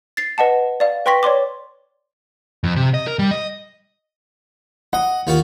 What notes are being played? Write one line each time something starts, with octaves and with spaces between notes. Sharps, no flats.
A6 C7
B4 D#5 F#5 A5
D5 F5
B4 G5 C6 C#6 A#6 B6
C#5 D5 C6 D6
F2
C3
D#5
A#4
G3
D#5
D#5 F#5
D#2 F4 F#4